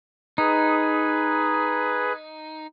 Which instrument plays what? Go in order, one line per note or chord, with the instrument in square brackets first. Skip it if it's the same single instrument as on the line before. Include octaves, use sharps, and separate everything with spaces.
[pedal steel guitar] D#4 [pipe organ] G#4 B4